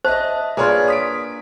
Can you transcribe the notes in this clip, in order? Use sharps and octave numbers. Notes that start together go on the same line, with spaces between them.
C5 D#5 E5 A5
A#3 D4 F4 G#4 B4 C#5
D#6 B6 D7